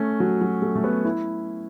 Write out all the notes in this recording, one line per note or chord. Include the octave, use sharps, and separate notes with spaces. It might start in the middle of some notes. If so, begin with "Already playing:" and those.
Already playing: A3 C#4
F#3
F#3
A3
A3
B3
E4